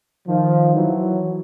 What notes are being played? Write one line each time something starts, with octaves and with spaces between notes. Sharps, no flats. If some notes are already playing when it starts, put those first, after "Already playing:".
D#3 F3
E3 F#3